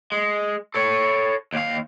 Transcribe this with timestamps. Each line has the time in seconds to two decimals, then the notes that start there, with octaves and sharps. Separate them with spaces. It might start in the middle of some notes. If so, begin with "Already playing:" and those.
0.12 G#3
0.74 A4 C#5
1.53 D#2 F5